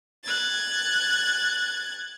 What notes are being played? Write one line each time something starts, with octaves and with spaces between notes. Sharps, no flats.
F#6 G#6 A6